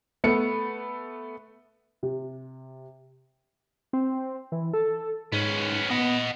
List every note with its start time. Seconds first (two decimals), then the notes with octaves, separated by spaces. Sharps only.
0.24 A3 B3 C#7
2.03 C3
3.93 C4
4.52 E3
4.73 A4
5.32 G#2 B3 C#4
5.90 B3 D#5 F#5